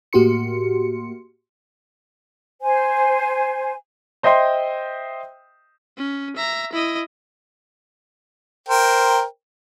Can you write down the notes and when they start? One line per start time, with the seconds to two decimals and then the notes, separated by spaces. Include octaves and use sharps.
0.13 A2 A#3 F#4 G4 C6 C#7
2.62 C5 G#5
4.23 C5 D#5 E5 G5 C6
5.98 C#4
6.36 E5 A#5
6.73 E4 D#5
8.69 A#4 C5 G5